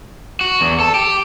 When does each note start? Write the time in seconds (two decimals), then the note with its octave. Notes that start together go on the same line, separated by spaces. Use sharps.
0.41 F#4
0.61 E2
0.80 A4
0.95 G4